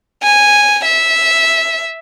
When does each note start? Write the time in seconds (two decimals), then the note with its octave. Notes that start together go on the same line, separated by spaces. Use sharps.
0.23 G#5
0.85 E5